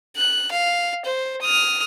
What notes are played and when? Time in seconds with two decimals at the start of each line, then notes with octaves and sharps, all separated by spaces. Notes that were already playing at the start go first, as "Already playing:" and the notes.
0.16 F#6
0.51 F5
1.05 C5
1.41 D#6 F6